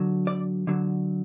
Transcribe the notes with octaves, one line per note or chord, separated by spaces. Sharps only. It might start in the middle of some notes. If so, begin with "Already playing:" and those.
Already playing: D3 F#3
D5
D3 F#3